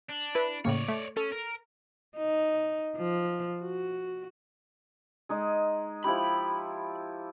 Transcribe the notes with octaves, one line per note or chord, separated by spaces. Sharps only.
D4
E4 B4 B5
A2 C#3 A#3 C#5 D5
A3
C#4 A4
A#4
D#4
F3
F#4
G#3 D#4 D#5
F3 E4 G4 B5